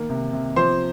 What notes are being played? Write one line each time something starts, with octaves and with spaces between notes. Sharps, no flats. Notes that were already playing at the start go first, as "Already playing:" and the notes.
Already playing: D#3 A#3
C3
C3
F3 C5 C6